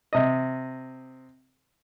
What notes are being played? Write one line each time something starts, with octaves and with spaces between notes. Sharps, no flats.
C3 D#5